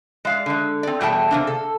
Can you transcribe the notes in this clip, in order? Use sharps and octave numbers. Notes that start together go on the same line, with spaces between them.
G#3 D5 F5
D3 G#3
C4 D5
E2 B2 G3 A3 G5 A5
C3 A#3 D4
A4